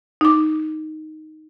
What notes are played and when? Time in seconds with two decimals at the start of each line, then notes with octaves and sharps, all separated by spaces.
0.21 D#4 D6